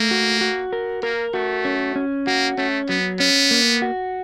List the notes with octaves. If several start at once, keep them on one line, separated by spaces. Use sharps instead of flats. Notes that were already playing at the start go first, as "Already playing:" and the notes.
Already playing: A3 A#3
F#4
F#4
A#4
A#3 A#4
A3 F#4
C#4
C#4
A#3 F#4
A3 C#4
F#3 B3
B3 C#4
A#3
F#4